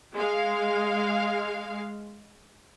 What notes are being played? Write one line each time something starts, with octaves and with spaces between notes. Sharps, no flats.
G#3 F5